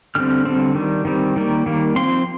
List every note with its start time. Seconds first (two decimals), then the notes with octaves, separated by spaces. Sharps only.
0.15 D3 G3 C4 F6
0.45 D3 G3 C4
0.75 D#3 G3
1.05 D#3 G3 C4
1.36 D#3 G3 A#3
1.66 D#3 G3 A#3
1.96 F3 C4 C6